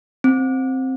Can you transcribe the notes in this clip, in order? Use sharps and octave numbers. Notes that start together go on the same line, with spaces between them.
C4